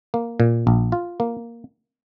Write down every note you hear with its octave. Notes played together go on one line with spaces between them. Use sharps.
A#3
A#2
A#1
F4
A#3